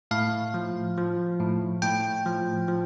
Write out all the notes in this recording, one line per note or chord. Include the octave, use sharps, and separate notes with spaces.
A2 F5
F3
F3
A2
A2 G5
F3
F3